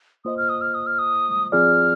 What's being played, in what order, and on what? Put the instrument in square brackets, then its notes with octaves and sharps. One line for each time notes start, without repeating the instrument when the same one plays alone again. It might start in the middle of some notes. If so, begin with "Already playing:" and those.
[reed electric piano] A#3 F4 C5 D#5 [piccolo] D#6
[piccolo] F6
D#6
F6
D#6
F6
D#6
[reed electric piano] F3 C4 F4 G#4 D5 [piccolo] F6